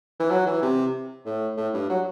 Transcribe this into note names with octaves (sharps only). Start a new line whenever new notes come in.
E3
F#3
E3
C3
A2
A2
G2
F#3